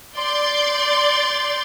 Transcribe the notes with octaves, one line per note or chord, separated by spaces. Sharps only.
D5 C6 G6 A6